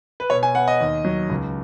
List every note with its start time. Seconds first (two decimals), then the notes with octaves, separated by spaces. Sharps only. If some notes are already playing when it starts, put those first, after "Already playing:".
0.20 B4
0.30 B2 C#5
0.43 G#5
0.55 B3 F#5
0.68 D#5
0.81 D#2
1.05 F#3
1.30 C#2